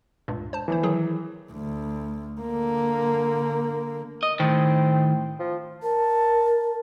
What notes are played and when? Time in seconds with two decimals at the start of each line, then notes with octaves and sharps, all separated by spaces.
0.28 C#2 G2 A#2
0.53 C5 A5
0.68 G1 E3 F3 C5
0.83 D#3 F#3 G#4
1.52 D2
2.41 D3 A#3
4.23 D#5
4.40 A2 D#3 C4
5.40 F3
5.82 A#4 A5